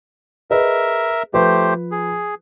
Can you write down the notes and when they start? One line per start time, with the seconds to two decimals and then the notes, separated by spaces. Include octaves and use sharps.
0.51 G#4 A#4 B4 D#5 E5
1.34 F3 A3 F4 G4 B4 C5
1.91 G#4